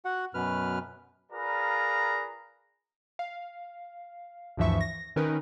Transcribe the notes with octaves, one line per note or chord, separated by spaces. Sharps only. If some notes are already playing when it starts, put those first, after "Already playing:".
F#4 F#5
F#2 B2 B4 F6
F4 G#4 A#4 B4 D5 A#5
F5
D2 G2 E3 F3 E5 C#6
A#6
D#3 C#4 D#4 A#4 B4